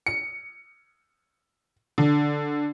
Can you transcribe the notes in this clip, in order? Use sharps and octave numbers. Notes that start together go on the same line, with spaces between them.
C#7
D3